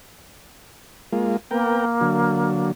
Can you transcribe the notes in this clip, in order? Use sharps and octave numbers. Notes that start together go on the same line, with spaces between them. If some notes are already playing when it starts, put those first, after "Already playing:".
G#3 A#3 F4
A#3 B3 A#4 G5
D3 F#3